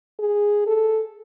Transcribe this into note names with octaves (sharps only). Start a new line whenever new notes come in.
G#4
A4